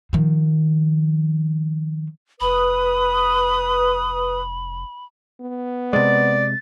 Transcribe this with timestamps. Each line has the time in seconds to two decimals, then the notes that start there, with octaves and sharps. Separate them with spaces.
0.13 D#3 F3
2.41 F1 B4 B5 D#6
5.41 B3
5.93 C3 G#3 D5 A6